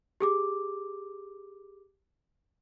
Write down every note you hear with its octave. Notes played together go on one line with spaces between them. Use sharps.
G4 G#4 D6